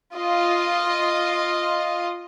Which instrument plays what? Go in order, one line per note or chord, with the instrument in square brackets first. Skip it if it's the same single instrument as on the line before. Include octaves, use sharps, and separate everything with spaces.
[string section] F4 D#5